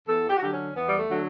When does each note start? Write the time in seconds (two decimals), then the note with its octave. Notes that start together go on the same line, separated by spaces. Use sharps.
0.06 E2 A4
0.30 G4
0.37 F#4
0.41 D3 F#3 G4
0.53 C#4
0.75 E2 B3
0.86 G3
0.98 A3
1.09 D3 F#3